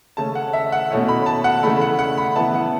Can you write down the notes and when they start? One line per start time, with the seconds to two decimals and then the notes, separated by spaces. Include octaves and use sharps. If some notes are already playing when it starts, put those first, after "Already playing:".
0.17 C#3 A3 C#4 A5
0.35 F#5
0.53 E5
0.72 F#5
0.91 B2 A3 C#4 E4
1.08 B5
1.26 A5
1.44 F#5
1.63 C#3 E3 A3 E4 B5
1.81 F#5
1.99 F#5
2.18 B5
2.36 C#3 E3 B3 E4 A5
2.54 F#5